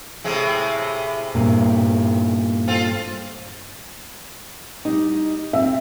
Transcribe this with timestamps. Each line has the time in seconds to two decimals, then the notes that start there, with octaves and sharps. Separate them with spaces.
0.24 A2 C3 G#3
1.35 G2 A#2
2.68 C4 F4 A4
4.85 G3 D#4
5.53 C4 E5